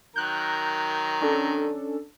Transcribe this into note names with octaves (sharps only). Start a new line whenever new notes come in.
D#3 F#3 A#4 F#6 G6
C#4 D4 A4